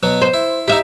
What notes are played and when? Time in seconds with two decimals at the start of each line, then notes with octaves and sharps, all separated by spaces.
0.03 B2 F#3 B3
0.22 C5
0.34 E4
0.68 D#4 E4 G4 E5